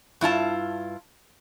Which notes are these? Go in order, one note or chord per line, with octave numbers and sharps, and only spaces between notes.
G2 E4 F4 A5